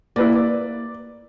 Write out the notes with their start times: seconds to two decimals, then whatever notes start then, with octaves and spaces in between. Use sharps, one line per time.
0.16 A#3 E4 B4 D5
0.36 D5